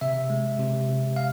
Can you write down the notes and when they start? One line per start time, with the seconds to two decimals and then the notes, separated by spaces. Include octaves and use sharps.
0.01 C3 E5
0.30 G#3
0.59 C3
0.89 C3
1.16 F5